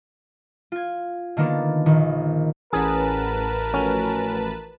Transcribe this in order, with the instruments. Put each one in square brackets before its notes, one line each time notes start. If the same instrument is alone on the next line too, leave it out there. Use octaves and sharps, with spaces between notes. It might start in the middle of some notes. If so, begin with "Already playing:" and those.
[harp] F4 G#6
D3 D#3 A#3 B3 D4
A#1 D#3
[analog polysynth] A1 B4 A5 [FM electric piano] E3 C#4 F#5 [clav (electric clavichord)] G#4 [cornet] A#4
[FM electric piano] F3 A3 F#4 [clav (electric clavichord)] C#4